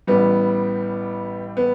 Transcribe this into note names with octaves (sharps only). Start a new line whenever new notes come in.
A1 A2 G3 B3
B3